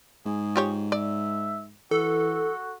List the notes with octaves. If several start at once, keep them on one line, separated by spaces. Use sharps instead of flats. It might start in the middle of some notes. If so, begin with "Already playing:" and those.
G#2 G#4
F4 G4 C#5
D5 E5
E3 F#4 A4